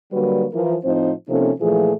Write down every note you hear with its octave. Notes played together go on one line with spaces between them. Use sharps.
D3 F#3 G3 A#3 F#4 B4
E3 F3 A#4
A2 F3 C4 D#4 C5
C3 F3 A#3 C#4 D#4 A4
A#2 E3 F3 A3 F4 G#4